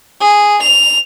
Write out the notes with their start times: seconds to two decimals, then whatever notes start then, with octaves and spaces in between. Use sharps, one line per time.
0.21 G#4
0.62 F7